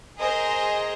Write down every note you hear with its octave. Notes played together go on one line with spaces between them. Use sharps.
G#4 A#4 C5 D#5